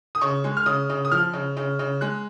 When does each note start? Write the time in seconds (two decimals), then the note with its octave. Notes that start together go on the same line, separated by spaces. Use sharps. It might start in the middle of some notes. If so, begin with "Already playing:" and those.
0.15 D#6
0.21 C#3 C#6
0.44 G#3
0.57 F6
0.66 C#3 D#6
0.90 C#3
1.05 D#6
1.12 F3 F6
1.33 C#3
1.57 C#3
1.79 C#3
2.01 G#3 F#6